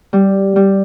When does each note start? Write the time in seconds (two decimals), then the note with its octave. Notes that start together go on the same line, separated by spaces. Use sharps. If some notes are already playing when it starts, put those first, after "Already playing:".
0.13 G3
0.56 G3